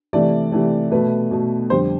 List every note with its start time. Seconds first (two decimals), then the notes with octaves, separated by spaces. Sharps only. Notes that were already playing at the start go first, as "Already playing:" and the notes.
0.13 C3 E3 A3 D5
0.52 C3 E3 A3
0.91 B2 A3 B4
1.31 B2 A3
1.70 F2 D3 G3 C5